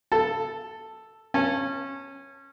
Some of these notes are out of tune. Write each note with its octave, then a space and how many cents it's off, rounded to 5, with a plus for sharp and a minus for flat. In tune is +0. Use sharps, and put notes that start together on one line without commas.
A4 +0 A5 +5
C#4 -20 A5 +0